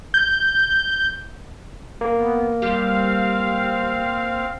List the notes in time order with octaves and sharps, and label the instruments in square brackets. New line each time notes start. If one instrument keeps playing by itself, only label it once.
[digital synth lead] G6
[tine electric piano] A#3
[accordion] B3
[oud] G3 G4 [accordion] C4 F5